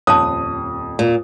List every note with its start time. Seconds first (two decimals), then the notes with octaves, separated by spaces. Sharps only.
0.07 D#1 F2 C#5 A5 D#6
0.99 A#2